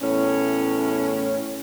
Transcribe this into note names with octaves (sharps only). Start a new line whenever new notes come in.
E2 A2 C#4